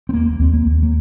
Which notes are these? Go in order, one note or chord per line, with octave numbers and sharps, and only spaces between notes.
C4
D#2 A#3
D#2 C4
A#3
D#2
A#3